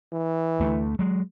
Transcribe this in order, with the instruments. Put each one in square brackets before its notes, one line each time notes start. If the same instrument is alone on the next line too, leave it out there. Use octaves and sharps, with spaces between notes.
[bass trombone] E3
[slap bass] D2 A3
F#3 G#3